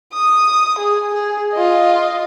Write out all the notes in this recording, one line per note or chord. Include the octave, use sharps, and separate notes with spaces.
D#6
G#4
G#4
F4 D#5